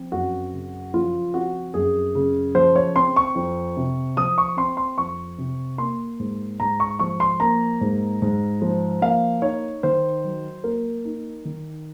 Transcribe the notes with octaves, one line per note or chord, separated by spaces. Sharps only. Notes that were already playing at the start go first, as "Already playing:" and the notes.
Already playing: F3 C4
F#2 F#4
C#3
F3 F4
C4 F#4
F#2 G#4
C#3
F3 C5
C#5
C4 C6
C#6
F2
C3
F3 D#6
C#6
C4 C6
C6
F2 C#6
C3
A#3 C6
G#2
G#2 A#5
C#6
F3 C#6
C6
A#3 A#5
G#2
G#2
F3
A#3 F5
D#4 C#5
D#3 C5
F#3
A#3 A#4
D#4
D#3